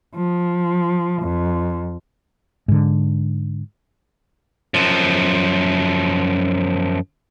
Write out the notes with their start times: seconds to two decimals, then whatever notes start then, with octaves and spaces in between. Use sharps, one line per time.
0.15 F3
1.22 F2
2.68 G#2 D3
4.74 F#2 F3